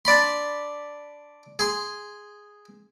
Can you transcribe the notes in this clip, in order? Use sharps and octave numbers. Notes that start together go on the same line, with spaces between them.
D4 D5 B5 C6
G#4 C6